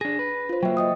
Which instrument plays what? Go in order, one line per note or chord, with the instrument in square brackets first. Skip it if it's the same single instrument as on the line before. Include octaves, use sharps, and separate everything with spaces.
[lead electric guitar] D4 G#4 [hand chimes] A#6
[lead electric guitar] B4
[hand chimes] F4 C5
[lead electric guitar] F#3 A#3 [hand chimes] E5 G5
[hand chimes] D#5 G5 D#6